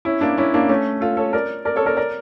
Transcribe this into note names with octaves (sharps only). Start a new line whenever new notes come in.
C#4 E4
A#3 D4
C#4 E4
A#3 D4
A3 C#4
F4 A4
A4 C#5
A#4 D5
A#4 D5
A4 C#5
A#4 D5
A#4 D5